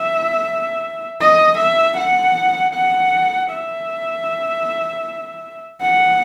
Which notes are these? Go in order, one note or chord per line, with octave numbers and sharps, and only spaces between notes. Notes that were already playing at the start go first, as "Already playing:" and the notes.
Already playing: E5
D#5
E5
F#5
F#5
E5
F#5